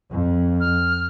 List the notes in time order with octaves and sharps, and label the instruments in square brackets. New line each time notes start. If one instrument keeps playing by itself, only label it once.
[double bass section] F2
[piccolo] F6